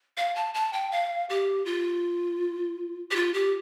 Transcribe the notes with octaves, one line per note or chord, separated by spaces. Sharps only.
F5
A5
A5
G5
F5
G4
F4
G4
F4
G4